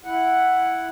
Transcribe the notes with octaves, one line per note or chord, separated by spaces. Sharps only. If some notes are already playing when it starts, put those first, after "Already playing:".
E4 F#5